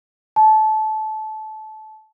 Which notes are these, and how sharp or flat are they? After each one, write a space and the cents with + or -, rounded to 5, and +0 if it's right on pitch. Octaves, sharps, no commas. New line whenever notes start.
A5 -20